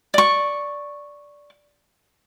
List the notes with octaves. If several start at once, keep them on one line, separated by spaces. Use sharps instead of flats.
D5 C#6